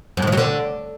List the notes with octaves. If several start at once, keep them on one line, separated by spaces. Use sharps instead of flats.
F#2
G#2
F3
F#3
D3